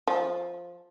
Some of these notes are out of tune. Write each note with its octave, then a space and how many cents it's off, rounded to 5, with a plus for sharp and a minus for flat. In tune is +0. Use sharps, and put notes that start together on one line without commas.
F3 +5